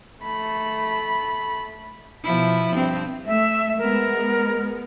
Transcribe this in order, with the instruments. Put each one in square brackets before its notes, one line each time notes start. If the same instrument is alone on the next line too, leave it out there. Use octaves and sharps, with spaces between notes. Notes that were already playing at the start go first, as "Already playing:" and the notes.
[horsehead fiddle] A3 B5
[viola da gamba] B2 F3 E4
G2 C4
[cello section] A3 [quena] E5
[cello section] G#3 B3 [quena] A#4